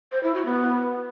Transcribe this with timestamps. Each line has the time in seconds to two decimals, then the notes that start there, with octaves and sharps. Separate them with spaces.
0.12 C5
0.23 E4
0.34 F#4
0.46 B3